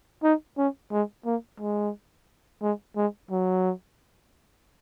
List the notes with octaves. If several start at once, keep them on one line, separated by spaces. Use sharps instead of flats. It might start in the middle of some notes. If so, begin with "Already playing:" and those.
D#4
C#4
G#3
A#3
G#3
G#3
G#3
F#3